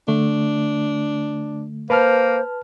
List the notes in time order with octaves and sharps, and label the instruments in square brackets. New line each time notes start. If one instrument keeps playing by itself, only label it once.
[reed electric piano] D3 A3 [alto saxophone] D4
[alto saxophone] A#3 [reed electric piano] B4 A5 F6 [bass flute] C5